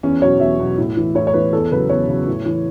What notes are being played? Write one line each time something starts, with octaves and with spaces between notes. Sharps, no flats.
E2 C#4
B2 F#3 C#5
E2 E5
B2 F#3
A2
E3
A2 C#5
C#5
E3 B4
E2 A4
C#3 F#3 B4
E2 C#5
C#3 F#3
A2
E3